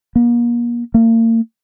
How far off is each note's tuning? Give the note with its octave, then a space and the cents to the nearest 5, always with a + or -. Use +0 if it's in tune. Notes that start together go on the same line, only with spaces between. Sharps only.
A#3 +35
A#3 -40